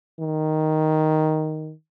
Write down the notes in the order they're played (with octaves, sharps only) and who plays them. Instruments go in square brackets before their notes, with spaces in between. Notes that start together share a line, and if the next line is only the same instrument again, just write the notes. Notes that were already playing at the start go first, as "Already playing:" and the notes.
[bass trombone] D#3